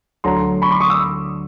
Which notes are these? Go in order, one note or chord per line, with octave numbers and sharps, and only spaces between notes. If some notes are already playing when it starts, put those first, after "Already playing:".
D2 D3 F#3 A#5 C6
B5 C#6
C6 D6
C#6 D#6
D6 E6